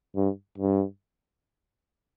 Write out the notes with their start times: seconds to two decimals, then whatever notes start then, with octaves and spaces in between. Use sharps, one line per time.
0.16 G2
0.58 G2